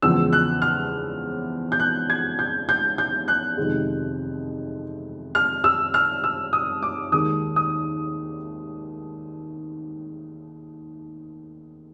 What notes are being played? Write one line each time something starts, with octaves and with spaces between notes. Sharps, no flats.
E2 C#3 F3 G#3 E6
F#6
F6
G6
F#6
G#6
G6
G6
G6
F#6
F2 C3 D#3 G#3
F6
E6
F6
E6
D#6
D6
D#2 D#3 G#3 D#6
D#6